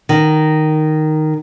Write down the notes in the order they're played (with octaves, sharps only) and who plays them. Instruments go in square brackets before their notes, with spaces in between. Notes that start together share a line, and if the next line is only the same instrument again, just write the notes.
[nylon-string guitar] D#3